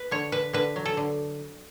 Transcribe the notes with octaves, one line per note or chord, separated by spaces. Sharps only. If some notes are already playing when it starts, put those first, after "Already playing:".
Already playing: B4
D3 C#5
D3 B4
D3 B4
F#3
A4
D3